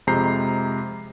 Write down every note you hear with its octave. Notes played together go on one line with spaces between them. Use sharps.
F2 C3 G#3 A#5 G6 C7